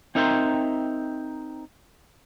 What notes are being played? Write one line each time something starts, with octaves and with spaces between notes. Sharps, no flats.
C4 D#4 A#4 E5 G5 C6